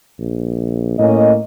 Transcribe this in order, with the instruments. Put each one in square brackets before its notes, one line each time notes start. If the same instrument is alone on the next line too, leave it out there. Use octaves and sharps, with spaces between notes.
[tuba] A#1
[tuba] A2 [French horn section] A#3 C#4 D#5